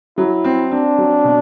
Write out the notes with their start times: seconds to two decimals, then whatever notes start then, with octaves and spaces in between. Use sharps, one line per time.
0.18 F#3 E4
0.44 C4
0.72 C4 D4
0.98 F#3
1.24 B2